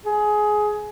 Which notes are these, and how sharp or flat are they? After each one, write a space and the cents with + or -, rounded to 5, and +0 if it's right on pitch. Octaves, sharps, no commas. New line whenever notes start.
G#4 +15